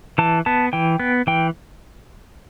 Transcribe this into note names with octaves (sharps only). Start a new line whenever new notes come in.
E3 A5
B3 A5
E3 G5
B3
E3 G5